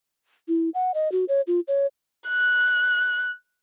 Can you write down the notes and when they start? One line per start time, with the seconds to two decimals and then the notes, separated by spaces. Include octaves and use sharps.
0.48 E4
0.74 F#5
0.94 D#5
1.12 F#4
1.29 C#5
1.47 F4
1.68 C#5
2.28 F#6